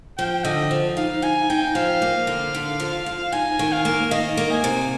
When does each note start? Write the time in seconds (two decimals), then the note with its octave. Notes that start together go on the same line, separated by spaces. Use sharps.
0.18 F3 G5
0.44 D3 D#5
0.71 F3
0.97 D#4 F5
1.22 D#4 G#5
1.49 D#4 G5
1.75 F3 F5
2.02 A#3
2.27 D3
2.55 D3
2.80 F3
3.06 F3
3.32 D#4 G#5
3.59 D#3
3.72 F5
3.85 A#3
4.11 D#3 D#5
4.37 A#3
4.51 G#5
4.64 C3